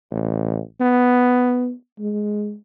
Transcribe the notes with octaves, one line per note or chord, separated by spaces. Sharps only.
A1
B3
G#3